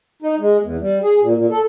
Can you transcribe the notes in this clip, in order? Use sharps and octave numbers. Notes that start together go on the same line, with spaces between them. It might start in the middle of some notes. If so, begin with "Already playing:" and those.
D#4
G#3
E2
G3
G#4
A#2
A#2
A4